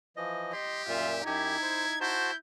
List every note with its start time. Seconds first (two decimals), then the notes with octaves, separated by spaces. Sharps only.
0.16 E3 F3 D#5
0.53 G4 D#5 C6
0.88 F#2 A#2 F4 E5
1.26 F#2 D#4 E4 G4 G#6
1.62 C5
2.01 E4 F#4 C5 A5 G6